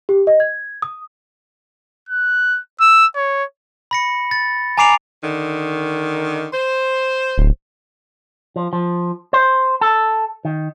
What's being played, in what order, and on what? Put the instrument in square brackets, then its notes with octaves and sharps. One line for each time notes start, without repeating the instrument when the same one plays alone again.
[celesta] G4
D#5
G#6
D#6
[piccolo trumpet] F#6
E6
C#5
[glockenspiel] B5 A#6 C#7
A6
G#5 A#5 D6 C7 D7 F7
[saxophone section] D3 D#3
C5
[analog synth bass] D1
[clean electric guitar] F3
F3
C5
A4
D#3